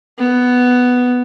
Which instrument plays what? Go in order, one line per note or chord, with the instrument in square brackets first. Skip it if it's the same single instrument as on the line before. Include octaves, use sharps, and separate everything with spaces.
[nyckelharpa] B3